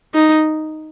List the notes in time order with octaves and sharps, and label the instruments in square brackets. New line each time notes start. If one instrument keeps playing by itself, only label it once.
[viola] D#4